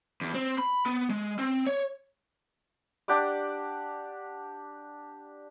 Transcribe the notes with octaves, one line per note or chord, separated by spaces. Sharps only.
E2
C4
B5
B3
G#3
C4
C#5
D4 G4 F#5 D6